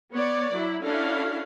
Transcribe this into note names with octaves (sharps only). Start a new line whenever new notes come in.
B3 C#5 D5
F#3 E4
C#4 D4 E4 F#4 A4 F5